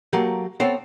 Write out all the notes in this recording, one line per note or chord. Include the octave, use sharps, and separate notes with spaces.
F#3 A3 A#3 G4
B3 C4 A4 C5 C#5 G5